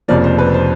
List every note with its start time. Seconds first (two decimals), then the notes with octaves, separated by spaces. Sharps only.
0.08 F1 F2 C#3 F3 A#3 D5
0.24 C5
0.39 B4
0.54 C5